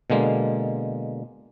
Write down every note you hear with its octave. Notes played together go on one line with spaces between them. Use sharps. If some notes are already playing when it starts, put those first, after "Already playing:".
B2 D3 G#3 A#3